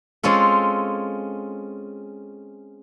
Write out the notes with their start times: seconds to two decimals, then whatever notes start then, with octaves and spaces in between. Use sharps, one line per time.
0.23 G#3 C4 C#4 F4 A4